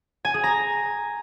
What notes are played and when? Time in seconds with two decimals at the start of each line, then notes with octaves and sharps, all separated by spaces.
0.25 G#5
0.34 G#4
0.44 A#5